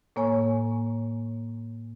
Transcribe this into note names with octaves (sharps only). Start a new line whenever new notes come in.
A2 A#3 C#5 G#5 C#6